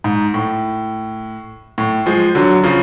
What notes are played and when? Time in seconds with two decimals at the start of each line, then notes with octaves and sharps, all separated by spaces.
0.04 G#2
0.34 A2
1.78 A2
2.06 F3 G#3
2.35 D3 F#3
2.64 C#3 F3